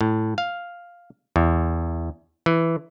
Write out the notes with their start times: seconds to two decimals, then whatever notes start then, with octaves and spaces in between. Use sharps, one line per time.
0.01 A2
0.38 F5
1.36 E2
2.46 E3